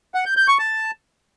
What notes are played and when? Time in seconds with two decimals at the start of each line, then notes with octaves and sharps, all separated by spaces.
0.15 F#5
0.26 G6
0.37 G6
0.48 C#6
0.59 A5